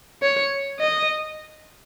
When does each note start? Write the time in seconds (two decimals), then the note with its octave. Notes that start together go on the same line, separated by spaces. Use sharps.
0.22 C#5
0.80 D#5